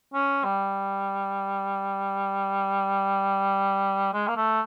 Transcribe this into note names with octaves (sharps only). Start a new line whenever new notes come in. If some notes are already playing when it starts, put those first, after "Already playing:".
C#4
G3
G#3
A#3
A3